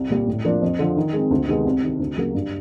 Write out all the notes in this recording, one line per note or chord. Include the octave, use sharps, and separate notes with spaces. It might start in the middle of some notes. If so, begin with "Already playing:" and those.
Already playing: C2
A#2 G3
A2
F3 A#3 D4
F2
D3 F3
D#3
G#3 C4
D2
C3 D#3 G#3 B3
C2
C3 D#3
D2
C#3 F#3 A#3
G2